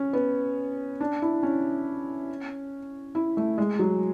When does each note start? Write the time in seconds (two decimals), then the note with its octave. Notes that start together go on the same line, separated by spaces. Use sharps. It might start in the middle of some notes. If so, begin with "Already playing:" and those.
Already playing: C#4
0.13 B3
1.01 D4
1.22 E4
1.43 C#4
3.15 E4
3.37 A3
3.58 G#3
3.79 F#3